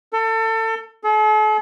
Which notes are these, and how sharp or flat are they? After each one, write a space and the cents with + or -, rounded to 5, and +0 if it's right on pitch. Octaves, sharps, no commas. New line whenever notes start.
A4 +30
A4 -45